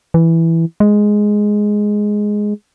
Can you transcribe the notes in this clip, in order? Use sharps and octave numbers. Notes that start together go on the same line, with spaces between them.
E3
G#3